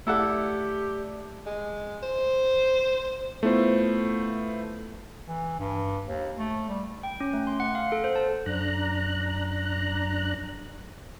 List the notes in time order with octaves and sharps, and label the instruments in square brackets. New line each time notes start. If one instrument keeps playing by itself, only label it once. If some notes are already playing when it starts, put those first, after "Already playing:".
[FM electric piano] A3 D5 [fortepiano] E4 A4 F#5 [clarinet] G4 [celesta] E6
[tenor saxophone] G#3
C5
[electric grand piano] A3 B3 E4 F4 C5
[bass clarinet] E3
G2
D#2
A3
G3
[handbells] G5
C#4
A3
C6
F#5
F5
A4
C5
A5
[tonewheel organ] F#2 D4 A#5 F#6